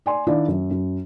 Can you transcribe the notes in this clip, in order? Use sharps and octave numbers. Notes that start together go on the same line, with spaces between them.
D5 G#5 C6
D#3 D4 E4 D5 F5
F#2
F#2